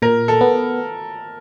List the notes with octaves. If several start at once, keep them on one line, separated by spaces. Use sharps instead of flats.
A#2 A#4
A4
B3